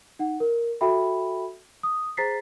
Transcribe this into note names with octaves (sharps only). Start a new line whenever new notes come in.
D#4 F#5
A#4
F#4 A4 E5 G5 B5
D#6
G#4 C5 A#5 A6 B6 C7